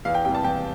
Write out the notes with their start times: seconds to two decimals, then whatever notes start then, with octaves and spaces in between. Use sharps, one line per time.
0.05 E2 F5
0.15 G5
0.25 C3 E3 G3 G5
0.35 A5
0.44 E2 G5